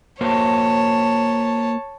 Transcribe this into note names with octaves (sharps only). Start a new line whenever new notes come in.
A#3 F#4 C5 C#5 A5